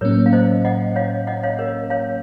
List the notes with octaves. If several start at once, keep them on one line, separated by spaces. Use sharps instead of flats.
A2 F#3 A#3 C#4 A#4 C#5
F5
C5 D#5
D#5 F#5
C#5 F5
D#5 F#5
C#5 F5
A#4 C#5
C#5 F5